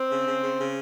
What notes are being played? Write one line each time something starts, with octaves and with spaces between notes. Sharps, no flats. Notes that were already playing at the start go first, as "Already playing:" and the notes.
Already playing: C4
C#3
C#3
C#3
C#3